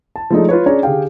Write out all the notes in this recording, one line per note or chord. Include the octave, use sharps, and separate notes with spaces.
A5
F3 G#3 A3 D4 D#4
F4 B4 C#5
C#4 D4 G#4 C#5 A#5
D3 G4 G#4 F5 G5